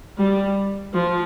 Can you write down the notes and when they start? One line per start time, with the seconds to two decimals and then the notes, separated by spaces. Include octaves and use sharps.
0.18 G3
0.94 F3